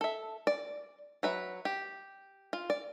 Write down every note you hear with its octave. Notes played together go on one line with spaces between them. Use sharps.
A4 E5
D5
F#3 B4 E5
G4
F4
D5